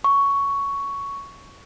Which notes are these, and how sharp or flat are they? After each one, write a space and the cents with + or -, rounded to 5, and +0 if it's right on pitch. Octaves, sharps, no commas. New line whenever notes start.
C#6 +10